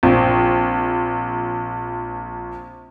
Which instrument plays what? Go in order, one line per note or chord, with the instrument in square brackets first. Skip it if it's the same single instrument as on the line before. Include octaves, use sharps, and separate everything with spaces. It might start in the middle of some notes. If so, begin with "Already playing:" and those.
[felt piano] A#1 [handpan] C4